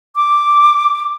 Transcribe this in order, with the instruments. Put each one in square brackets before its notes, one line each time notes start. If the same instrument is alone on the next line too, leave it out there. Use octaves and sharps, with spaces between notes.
[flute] D6